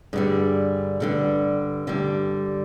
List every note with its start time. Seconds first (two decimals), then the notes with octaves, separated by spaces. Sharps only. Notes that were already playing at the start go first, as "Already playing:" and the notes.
0.13 G2 D3 G3 G#4
1.00 G2 D3 G3
1.87 G2 D3 G3